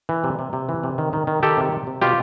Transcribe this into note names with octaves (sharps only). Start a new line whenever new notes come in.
E3
C3
C3
C3
E3
C3
D#3
D#3
D#3
D#3 G4 A4
C3
C3
C3
B2 F4 G4